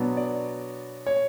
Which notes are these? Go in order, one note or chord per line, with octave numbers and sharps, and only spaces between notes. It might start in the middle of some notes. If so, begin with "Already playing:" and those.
Already playing: B2 F#3 B3 D4
D5
C#5